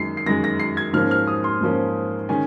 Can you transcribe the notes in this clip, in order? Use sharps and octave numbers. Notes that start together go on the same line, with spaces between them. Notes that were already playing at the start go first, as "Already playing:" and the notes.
Already playing: F#2 D#3 G#3 C7
C7
F#2 D#3 G#3 A#6
A#6
C7
G#6
G#2 F3 A#3 C#4 F6
F6
D#6
C6
G#2 F3 A#3 C#4
D#3 G#3 C#4 G#5